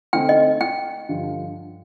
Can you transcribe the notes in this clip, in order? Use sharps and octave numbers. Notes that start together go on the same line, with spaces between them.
D3 A3 C4 D#4 G5
D#5
G5
G2 D3 F3